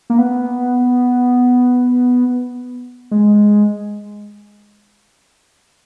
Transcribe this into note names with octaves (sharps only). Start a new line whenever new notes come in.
A#3
B3
G#3